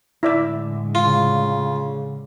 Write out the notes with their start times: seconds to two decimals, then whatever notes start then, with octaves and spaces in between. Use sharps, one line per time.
0.23 A2 D3 G#3 E4 D5 E5
0.95 C#3 F4